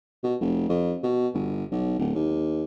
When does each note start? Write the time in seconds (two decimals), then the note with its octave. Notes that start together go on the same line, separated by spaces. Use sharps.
0.23 B2
0.41 F1
0.69 F2
1.03 B2
1.34 G1
1.72 B1
1.99 D1
2.15 D#2